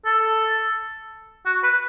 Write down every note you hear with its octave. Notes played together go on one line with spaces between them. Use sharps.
A4
F#4
B4